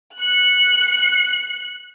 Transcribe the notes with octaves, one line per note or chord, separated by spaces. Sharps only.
F#6 C#7